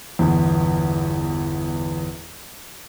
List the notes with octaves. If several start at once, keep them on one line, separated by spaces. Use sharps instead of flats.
G1 E2